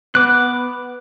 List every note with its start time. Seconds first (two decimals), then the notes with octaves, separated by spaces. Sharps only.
0.15 B3 D6 F#6